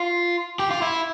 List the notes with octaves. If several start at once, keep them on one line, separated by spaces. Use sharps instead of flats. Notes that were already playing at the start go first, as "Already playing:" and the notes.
Already playing: F4
G4
F4
E4